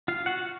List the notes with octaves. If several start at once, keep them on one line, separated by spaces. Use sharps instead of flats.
F4 F5
F#4 F#5